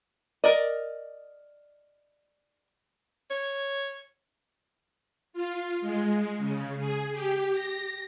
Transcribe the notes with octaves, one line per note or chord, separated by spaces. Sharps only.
A#4 D5 D#5
C#5
F4
G#3
C#3
G#4
G4
A#6